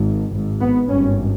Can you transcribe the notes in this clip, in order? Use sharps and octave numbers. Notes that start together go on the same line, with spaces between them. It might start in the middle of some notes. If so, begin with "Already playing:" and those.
Already playing: G#1 G#2
G#1 G#2
B3
G#1 G2 C#4